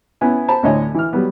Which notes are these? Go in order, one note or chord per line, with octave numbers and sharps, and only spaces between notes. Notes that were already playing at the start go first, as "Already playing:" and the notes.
B3 C#4 E4 G#5
C5 A5 B5
D2 A2 D3 C#5 D#5 G#5
E3 F6
F#3 G3 B3